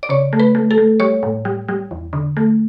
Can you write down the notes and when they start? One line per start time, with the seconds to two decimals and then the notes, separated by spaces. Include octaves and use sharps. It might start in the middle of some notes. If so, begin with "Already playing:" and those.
0.03 D5
0.09 C#3 C#5
0.33 A3
0.40 B4
0.55 A3
0.71 A4
0.78 A3
1.00 G3 C#5
1.23 A2
1.45 G3
1.68 G3
1.91 E2
2.13 D3
2.37 A3